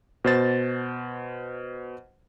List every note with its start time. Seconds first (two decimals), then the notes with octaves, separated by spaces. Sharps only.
0.24 B2 C5 A6